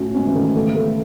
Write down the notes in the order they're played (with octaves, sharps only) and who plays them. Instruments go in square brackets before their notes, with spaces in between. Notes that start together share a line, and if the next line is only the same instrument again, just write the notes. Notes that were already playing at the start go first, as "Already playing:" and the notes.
Already playing: [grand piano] A2 [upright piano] C#4 F#4
[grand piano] G#2 [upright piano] C#4
[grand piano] E3
[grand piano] D#3 [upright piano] A3
[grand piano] C#3 [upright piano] A3
[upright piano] A3